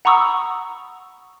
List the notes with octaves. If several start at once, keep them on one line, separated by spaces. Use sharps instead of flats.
F#5 A#5 B5 C#6 D#6 E6